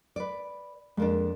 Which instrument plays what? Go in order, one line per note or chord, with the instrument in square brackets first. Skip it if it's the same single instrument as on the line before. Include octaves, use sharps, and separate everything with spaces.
[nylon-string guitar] B4 D5
[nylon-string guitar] F2 A#3 D4 [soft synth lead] G#3